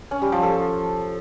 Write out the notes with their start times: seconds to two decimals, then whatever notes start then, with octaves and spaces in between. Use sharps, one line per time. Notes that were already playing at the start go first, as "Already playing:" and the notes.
0.11 C#4
0.22 G3
0.32 F3
0.43 A4